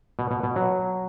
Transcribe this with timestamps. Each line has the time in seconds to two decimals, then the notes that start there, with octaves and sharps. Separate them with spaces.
0.19 B2
0.31 B2
0.43 B2
0.56 F#3